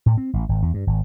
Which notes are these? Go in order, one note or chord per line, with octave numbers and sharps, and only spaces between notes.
A2
C4
A1
G#1
E2
G2
G#1